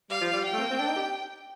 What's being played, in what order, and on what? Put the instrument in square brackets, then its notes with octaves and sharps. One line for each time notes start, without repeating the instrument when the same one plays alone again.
[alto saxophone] G3 [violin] F5
[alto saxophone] F3
G3
[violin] G5
[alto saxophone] A3
C4
A#3
C4
D4
D#4
G4